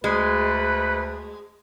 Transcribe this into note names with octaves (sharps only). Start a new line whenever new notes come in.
D2 G#3 B4